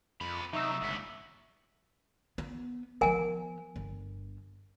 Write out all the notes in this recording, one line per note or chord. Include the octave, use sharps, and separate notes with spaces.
F2 C4 B5
C3 F#3 D#4 E5 C#6 E6
G1 C#2 B3
B3
F3 B3 A#4 G#5
G1